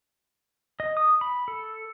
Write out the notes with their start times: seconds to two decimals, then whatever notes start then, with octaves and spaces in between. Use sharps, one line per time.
0.80 D#5
0.97 D#6
1.21 B5
1.48 A4